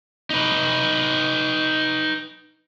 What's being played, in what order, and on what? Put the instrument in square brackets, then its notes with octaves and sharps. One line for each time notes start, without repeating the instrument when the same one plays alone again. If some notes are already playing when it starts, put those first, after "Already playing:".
[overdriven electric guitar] D#4 B4